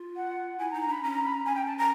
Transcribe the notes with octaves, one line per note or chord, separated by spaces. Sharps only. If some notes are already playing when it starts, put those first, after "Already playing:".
Already playing: F4
F#5
E4 G#5
A#5
D#4
A#5
D4 B5
C#4 A#5
A#5
B5
A#5
C#4 G#5
G5
A5
A#5